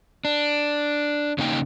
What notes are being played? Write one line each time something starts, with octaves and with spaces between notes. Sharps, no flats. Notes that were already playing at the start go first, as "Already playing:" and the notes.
D4
C#3 A#3 D#4 G5